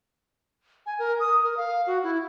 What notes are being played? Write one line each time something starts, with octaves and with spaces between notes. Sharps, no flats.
G#5
A#4
D#6
A#4
F5
F#4
E4